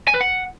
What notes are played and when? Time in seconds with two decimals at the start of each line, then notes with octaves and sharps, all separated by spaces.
0.08 G#5
0.14 B4
0.21 F#5